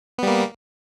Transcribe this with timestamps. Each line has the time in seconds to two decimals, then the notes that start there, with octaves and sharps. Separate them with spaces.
0.18 B3
0.23 G3
0.27 A#3